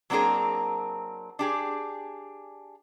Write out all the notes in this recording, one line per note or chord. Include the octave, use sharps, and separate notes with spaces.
F#3 A#3 C4 D4 G#4 A#4
D4 G4 G#4